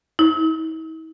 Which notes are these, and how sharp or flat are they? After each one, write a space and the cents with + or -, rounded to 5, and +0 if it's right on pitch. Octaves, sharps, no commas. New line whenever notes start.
E4 -45